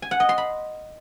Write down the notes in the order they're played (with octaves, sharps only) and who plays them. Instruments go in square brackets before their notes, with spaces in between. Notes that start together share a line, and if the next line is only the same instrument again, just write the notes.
[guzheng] G#5
F#5
D#5
C6
B5